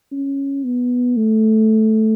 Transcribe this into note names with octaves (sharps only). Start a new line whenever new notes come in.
C#4
B3
A3